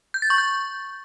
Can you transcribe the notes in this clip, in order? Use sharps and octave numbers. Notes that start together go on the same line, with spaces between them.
G6
A6
C#6
G6